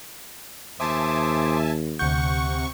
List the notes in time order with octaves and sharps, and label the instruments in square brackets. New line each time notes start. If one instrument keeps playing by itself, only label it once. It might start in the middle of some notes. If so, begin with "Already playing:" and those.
[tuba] D#2 [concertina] C5 D6 D#6 [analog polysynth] E5 G#5 A5
[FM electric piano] D2 G6 [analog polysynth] C3 C#6 [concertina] F#5